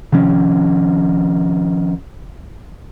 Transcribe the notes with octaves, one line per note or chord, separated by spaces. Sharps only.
C3 D#3 F3 C#4